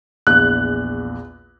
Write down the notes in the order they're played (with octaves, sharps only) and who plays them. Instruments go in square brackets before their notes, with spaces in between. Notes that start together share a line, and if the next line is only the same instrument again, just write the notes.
[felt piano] A#1 E2 [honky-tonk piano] F#6